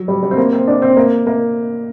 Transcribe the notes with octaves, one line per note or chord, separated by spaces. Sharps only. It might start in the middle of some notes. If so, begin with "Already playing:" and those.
Already playing: F#3
G3
G3
C4
A#3
C4
D4
C4
A#3
A#3